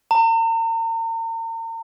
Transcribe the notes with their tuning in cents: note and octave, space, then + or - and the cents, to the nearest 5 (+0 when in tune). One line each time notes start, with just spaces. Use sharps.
A#5 -40